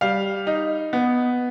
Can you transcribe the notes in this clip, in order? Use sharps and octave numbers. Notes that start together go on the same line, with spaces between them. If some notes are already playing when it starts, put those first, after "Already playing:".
G3 F5
D#4
B3